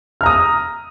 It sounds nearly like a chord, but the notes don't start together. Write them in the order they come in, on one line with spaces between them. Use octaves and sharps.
F6 A#5 D#6